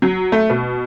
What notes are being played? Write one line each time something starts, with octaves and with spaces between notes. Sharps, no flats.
F#3
A3
B2